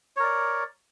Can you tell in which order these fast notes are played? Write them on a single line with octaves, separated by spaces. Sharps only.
C#5 A#4 D5